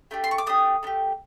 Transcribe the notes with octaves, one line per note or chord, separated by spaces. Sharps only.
A3 D4 G4
C6
C#6
D6
A3 D4 G4 D#6
A3 D4 G4